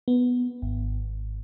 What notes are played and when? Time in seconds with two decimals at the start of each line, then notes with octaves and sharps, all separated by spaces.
0.08 B3
0.62 G#1